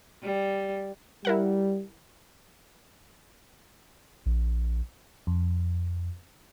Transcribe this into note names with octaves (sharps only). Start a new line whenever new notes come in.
G3
G3 E4 A#4 F#5
A#1
F2